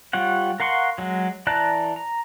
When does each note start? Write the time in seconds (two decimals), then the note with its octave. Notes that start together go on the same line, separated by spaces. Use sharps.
0.13 G3 F4 C#5 F#5
0.60 A#4 F5 F#5 C6 C#6
0.98 F#3 G#3
1.47 E3 D5 A5 A#5 F#6
1.96 A#5